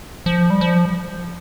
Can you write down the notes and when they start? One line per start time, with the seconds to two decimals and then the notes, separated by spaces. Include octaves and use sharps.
0.26 F3
0.50 G3
0.61 F3